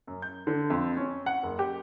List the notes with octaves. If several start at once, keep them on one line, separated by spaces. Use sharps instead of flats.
F#2
G6
D3
F2
C#4
F#5
F#1
G4